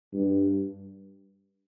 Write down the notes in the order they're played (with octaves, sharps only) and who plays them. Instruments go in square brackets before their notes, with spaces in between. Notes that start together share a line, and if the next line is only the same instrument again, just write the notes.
[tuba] G2